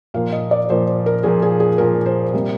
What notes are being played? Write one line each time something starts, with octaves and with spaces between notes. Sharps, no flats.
A#2 F3 A#3 F5
D#5
D5
A#2 F3 A#3 C5
A#4
A#2 F3 A#3 G#4
G#4
G#4
A#2 F3 A#3 A#4
C5
C3 G3 A#3